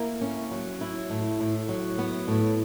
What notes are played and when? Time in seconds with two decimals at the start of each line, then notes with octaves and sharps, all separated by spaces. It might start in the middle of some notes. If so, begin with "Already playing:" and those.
Already playing: A#3 E4
0.21 C#4
0.51 F#3
0.81 E4
1.10 A2
1.40 A2
1.69 F#3
1.98 B3
2.28 A2